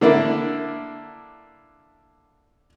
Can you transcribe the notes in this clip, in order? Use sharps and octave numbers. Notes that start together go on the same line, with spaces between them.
D3 A#3 D4 E4